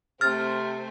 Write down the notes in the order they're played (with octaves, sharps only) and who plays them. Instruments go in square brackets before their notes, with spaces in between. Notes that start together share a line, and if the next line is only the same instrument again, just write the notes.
[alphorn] C3 [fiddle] A3 C4 [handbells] F6 A6